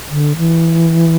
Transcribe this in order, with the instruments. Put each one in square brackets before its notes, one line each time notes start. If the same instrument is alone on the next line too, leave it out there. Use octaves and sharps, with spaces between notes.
[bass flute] D3
E3